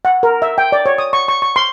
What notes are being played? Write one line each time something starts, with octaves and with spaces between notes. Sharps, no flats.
F#5
A#4
E5
G5
D5
C#5
D#6
C#6
C#6
C#6
C6